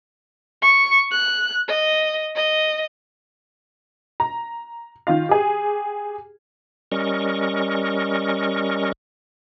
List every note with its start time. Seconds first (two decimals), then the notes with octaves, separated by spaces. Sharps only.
0.62 C#6
1.11 F#6
1.68 D#5
2.36 D#5
4.20 A#5
5.07 D#3 F4 F5
5.29 G4 G#4
6.92 G3 C#4 A#4 D#5 C#6